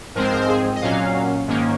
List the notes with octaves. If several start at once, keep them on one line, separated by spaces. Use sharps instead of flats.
G#2 F3 G#3 C4 A#4
C5
A#4
C5
G#4
D#5
A#2 F#3 C#4 F5
G#2 D#3 A#3 C#4